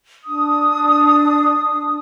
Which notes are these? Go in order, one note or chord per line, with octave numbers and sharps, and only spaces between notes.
D4 D#6